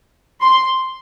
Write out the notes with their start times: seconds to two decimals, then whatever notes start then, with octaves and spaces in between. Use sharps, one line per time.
0.41 C6